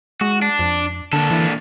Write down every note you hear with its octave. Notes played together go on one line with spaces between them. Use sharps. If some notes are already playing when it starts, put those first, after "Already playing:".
G#3 F#4
D4
F2
A#2 D3 D4 A4
E3